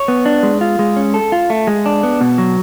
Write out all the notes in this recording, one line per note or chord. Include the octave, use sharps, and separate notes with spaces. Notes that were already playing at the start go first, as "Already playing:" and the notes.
Already playing: C#5
B3
D4
G#3
F4
G#3
C#4
A4
F4
A3
G#3
D4
B3
B2
F#3